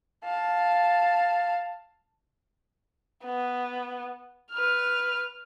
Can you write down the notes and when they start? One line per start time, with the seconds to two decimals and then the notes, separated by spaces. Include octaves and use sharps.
0.24 F5 A5
3.24 B3
4.52 B4 F6